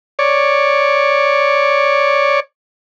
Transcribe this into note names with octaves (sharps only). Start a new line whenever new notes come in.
C#5 D5